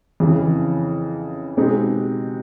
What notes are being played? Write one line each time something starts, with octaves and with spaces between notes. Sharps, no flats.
F2 C#3 E3
B2 G#3 C4 D#4 G4